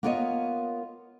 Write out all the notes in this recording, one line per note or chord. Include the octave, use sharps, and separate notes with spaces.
A#3 B3 F4 A#4 C#5 D#5